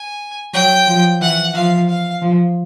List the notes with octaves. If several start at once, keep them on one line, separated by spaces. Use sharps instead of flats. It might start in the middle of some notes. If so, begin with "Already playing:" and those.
Already playing: G#5
F#3 G5
F3
E3 F#5
F3 F5
F5
F3